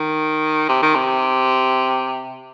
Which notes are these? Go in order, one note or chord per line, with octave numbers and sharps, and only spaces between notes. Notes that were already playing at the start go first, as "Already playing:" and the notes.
Already playing: D#3
C3
D#3
C3